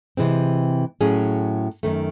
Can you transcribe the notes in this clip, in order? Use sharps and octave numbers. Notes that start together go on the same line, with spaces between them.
C3 E3 G#3 C4
A2 F#3 C#4 G#4
F#2 D#3 A3